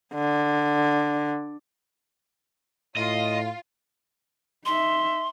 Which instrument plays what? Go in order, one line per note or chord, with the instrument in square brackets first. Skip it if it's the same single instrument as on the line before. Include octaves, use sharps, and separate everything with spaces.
[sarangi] D3
[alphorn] A2 [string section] F4 [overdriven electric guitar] D#5
[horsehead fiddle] D#4 E5 [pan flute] C6